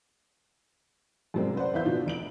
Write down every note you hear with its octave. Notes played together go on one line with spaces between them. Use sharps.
F#2 C3 G3 G#3 A#3 C4
B4 C5 D5 F#5
E2 B3 E4 E5 F5 G6
B2 D3 F3 D4 D#4
F1 D7 F#7